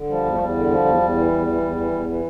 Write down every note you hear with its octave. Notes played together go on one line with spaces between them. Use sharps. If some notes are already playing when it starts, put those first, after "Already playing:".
Already playing: D3
F3 G3
E2
A3
E2 G3
D3
F3
E2
E2
E3
E2
E3
E2
E3
E2
E3